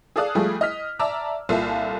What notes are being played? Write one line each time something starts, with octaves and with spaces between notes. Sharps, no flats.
G#4 A4 D5 F5 D#6 F#6
F3 G3 A3 G#4
D#5 F6 B6
D5 E5 A5 A#5 D6 E6
C2 A#2 F4 A4 E5 F5